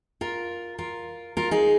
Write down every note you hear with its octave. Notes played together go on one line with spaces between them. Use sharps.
F4 A#4
F4 A#4
F4 A#4
D#4 G#4